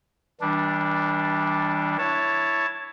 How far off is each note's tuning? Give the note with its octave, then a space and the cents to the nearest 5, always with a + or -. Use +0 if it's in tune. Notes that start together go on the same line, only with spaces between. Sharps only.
E3 -40 G3 +0 D4 +0
E4 +0 C#5 +0 A5 +0